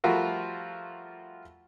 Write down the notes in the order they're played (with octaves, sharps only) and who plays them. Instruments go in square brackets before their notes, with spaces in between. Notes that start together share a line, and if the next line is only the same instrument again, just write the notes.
[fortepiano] F3 G3 A3 F4 F#4 A#4